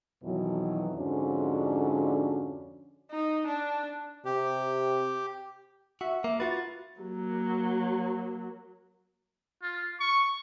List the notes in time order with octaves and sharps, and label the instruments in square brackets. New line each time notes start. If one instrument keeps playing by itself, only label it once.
[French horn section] F2 B2 D#3 E3 F#3
F2 G#2 D3 C#4 D4 F#4
[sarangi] D#4
D4
[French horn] C3 [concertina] G4
[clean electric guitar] F#4 [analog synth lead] E5
[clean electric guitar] A#3
[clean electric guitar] F4 F#4 B4 [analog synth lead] A6
[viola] F#3 A#3
[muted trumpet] F4
C#6